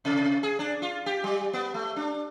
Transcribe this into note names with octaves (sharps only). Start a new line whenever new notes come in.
C3
G#4
D4
F4
G4
G3
B3
A3
D4